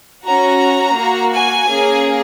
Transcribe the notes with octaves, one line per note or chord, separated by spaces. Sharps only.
C#4 F#4 A#5
A#3 F#4
G#5
A#3 C#4 G#4